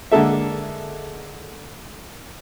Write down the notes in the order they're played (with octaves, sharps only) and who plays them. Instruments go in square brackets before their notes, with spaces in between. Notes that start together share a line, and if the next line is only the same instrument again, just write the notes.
[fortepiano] D3 G#3 A#3 G#4 A4 E5